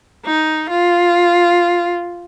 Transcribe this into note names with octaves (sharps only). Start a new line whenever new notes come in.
D#4
F4